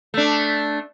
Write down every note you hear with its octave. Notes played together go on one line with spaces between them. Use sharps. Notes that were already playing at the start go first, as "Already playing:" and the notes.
A3 D4